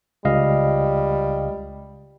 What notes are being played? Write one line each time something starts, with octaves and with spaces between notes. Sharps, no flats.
C#2 G3 D#5 F5